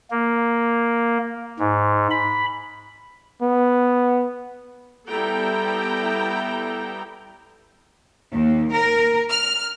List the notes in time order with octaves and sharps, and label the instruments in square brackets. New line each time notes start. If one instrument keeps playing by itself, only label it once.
[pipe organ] A#3
G#2
B5
[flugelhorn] B3
[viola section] G3 B3 E4 A4 G5 A#5
[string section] D#2
A#4
F6